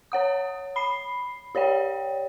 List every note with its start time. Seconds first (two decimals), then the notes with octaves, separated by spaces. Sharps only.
0.12 C#5 F#5 D#6
0.76 B5 C7
1.55 G4 C#5 D5 G5